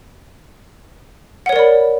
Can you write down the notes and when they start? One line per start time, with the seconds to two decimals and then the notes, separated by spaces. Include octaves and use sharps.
1.46 F#5
1.49 C#5
1.53 A#4
1.56 D5
1.59 B5